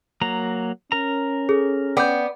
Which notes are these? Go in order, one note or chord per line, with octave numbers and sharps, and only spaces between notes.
F#3 A#3 A#5
C#4 A#4 A#5
G#4 A4
B3 D5 G5 G6